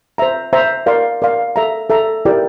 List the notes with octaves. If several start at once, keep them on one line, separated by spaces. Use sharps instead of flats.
C5 E5 A#5
C5 E5 A#5
A#4 D5 F5 C6
A#4 D5 F5 C6
A4 E5 A#5
A4 E5 A#5
E4 G4 A#4 D5 G5